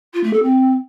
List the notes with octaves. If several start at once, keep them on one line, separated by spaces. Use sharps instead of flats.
F4
A3
A4
C4